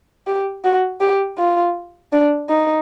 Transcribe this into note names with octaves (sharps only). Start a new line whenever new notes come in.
G4
F#4
G4
F4
D4
D#4